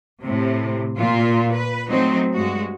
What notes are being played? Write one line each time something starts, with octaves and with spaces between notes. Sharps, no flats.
A2 C3
A#2 F4
B4
F#3 A3 C4 D#4
G2 G#3 F#4